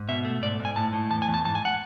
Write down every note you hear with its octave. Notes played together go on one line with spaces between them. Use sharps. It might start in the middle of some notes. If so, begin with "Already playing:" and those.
Already playing: G#2
B2 E5
A3
G#2 D5
G#2
G#5
A2 A5
A2
E2 A5
G#5
E2
A5
G#2 A5
G#5
F#5